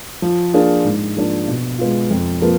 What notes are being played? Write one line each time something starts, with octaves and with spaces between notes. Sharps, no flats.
F3
A#3 D4 F4 G#4
G#2
F3 A#3 D4
B2
G#3 B3 F4
F2
F3 A#3 F4 B4